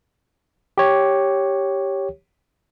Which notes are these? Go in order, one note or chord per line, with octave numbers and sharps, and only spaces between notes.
G4 C#5